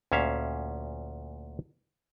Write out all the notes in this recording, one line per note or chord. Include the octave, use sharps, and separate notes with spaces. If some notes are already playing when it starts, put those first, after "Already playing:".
D2 A#2 C#4 E5 F5